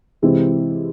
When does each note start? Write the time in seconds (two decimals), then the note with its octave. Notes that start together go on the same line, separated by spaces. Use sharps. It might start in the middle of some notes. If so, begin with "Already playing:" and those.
0.22 C3 E3 G#3 C4 E4